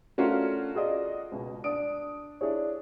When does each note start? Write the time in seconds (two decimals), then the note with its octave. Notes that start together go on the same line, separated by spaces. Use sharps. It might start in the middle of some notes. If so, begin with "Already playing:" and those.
0.18 A3 C#4 D4 F4 F#4 A#4
0.74 F4 F#4 G#4 D5 D#5
1.32 C#2 B2
1.64 D4 D5 D#6 D7
2.41 D4 E4 G#4 C#5